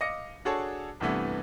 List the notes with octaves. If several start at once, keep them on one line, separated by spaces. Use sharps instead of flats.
D#5 F5 D6 A#6 C#7
D4 F#4 G#4 A4 C#5 A5
C2 G2 C3 E3 A3 B3